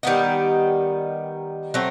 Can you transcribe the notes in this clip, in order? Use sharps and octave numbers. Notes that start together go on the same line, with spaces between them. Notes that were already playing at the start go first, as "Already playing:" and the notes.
D#3 G3 B3 D#4
F#3 A3 C4